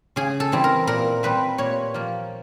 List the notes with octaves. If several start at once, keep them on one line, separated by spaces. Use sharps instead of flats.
C#3 G#4
A4
E3 G3 C4
A#4
A#2 A#4
G3 C4 B4
A#2 C#5
F3 A#3